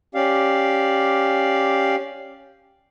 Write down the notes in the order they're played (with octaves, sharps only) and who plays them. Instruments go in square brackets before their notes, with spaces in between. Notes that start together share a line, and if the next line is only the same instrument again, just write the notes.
[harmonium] C#4 G4 D5 F5